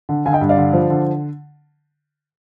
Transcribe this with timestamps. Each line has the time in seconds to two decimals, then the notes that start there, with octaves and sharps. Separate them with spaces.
0.09 D3
0.25 D3 F5 G#5
0.33 D#5 G5
0.41 G2
0.49 D5 F5
0.57 D3
0.73 F3
0.90 D3